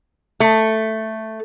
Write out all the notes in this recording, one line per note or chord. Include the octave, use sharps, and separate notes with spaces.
A3